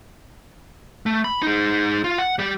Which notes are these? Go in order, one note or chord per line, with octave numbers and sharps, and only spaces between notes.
A3
B5
D#4 G#4
F4
F#5
G3 G4